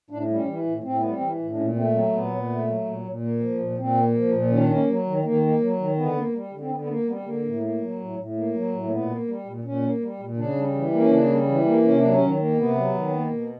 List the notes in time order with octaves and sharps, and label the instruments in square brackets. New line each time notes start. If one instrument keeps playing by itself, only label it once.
[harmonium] A2 D4
G3
C#4
E3
A2
A2 C4
B3
G3
C4
E3
A2
D4
A#2 C#4
A3 C4
F#3 C4
A#2 B3
A#2
A3
F#3
A#2
A#2
A#3
F3
A#2
A#2 C4
A#3
F3
A#2
D#3 C#4
D4
A#3 C#4
F#3
D#3
D#3 A#3
A#3
F#3
D#3
D3 B3
A#3
G3
D3
C4
D3 B3
B3
A#3
G3 B3
D3 A#3
A2
A#3
F#3
A2
A2
A#3
F#3
A2
A#3
A#2 B3
A#3
G3
A#2
A#2 C#4
A#3
G3
A#2
C#3 D4
G3
E3
A#3
C#4
C#3 D4
G3
E3
A#3
C3 C#4
D4
F#3
C#4
D#3
A#3
C3 B3
F#3
D#3
A#3
B2